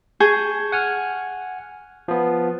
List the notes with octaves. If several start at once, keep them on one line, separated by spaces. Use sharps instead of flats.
G#4 A5 C#6 G6
F#5 G#5 F6
F3 B3